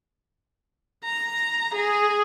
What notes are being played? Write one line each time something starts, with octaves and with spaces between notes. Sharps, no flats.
A#5
G#4